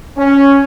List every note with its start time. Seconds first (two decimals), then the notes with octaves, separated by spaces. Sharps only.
0.17 C#4